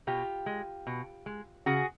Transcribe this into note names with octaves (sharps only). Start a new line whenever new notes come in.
B2 F4 G4
G#3
B2
G#3
C#3 F#4 G#4